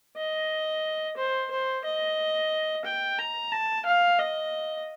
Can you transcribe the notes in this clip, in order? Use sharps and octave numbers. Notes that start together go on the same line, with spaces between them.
D#5
C5
C5
D#5
G5
A#5
A5
F5
D#5